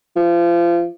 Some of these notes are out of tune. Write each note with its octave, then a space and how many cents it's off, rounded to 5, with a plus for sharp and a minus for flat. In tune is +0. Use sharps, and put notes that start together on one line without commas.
F3 -30